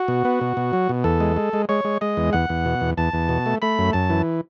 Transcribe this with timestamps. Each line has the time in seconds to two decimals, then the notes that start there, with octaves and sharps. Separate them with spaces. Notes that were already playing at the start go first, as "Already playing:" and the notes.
Already playing: F#4
0.08 B2
0.25 B3
0.41 B2
0.57 B2
0.73 F#3
0.89 B2
1.04 E2 A4
1.20 G#3
1.36 G#3
1.53 G#3
1.69 G#3 C#5
1.85 G#3
2.01 G#3 D#5
2.17 E2
2.33 E2 F#5
2.49 E2
2.65 B2
2.81 E2
2.97 E2 A5
3.13 E2
3.29 B2
3.46 A3
3.62 A3 B5
3.78 F#2
3.93 F#2 A5
4.10 E3